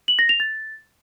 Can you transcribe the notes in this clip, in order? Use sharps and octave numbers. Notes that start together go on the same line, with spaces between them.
F#7
A#6
F7
A6